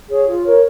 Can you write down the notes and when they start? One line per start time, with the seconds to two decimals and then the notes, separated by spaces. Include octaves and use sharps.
0.09 G#4 C#5
0.27 F4
0.44 A#4 C#5